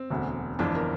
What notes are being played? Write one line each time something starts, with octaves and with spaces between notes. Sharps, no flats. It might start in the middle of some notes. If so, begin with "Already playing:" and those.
Already playing: C4
E1 D2 D3
G1 F2 E3 D4
A#4